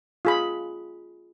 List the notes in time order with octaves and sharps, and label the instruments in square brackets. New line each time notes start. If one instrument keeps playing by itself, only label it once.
[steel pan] F4 G#4 B5